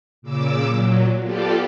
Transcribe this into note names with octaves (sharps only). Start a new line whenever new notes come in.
A#2 C#3 D6 E6
A#2 F#3
B3 F4 G4 A4 D5